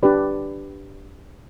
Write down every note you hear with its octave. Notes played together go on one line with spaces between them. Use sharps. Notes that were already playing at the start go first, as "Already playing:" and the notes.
D4 G4 B4 D5